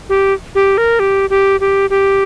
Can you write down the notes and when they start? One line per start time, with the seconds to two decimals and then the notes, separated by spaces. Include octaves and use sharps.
0.09 G4
0.55 G4
0.78 A#4
0.99 G4
1.30 G4
1.60 G4
1.90 G4